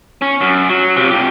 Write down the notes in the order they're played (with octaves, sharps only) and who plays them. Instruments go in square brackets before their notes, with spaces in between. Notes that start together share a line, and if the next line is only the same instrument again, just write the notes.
[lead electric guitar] C#4
F#2
F#3
C3 F3
F2 G4